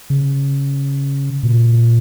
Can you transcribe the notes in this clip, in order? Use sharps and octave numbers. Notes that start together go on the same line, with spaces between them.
C#3
A#2